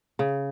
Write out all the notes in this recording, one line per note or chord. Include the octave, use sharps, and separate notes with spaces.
C#3